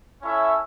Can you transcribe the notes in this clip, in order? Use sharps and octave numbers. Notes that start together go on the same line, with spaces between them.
C#4 E4 A4 C#5 E5